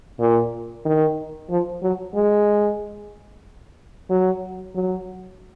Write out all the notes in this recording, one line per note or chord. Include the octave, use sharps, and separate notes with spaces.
A#2
D#3
F3
F#3
G#3
F#3
F#3